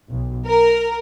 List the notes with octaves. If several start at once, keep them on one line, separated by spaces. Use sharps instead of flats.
B1
A#4